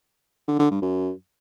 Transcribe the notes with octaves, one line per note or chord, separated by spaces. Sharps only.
D3
D3
G2
F#2